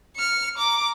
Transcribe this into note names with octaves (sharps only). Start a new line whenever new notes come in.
F6 C#7
A#5 D6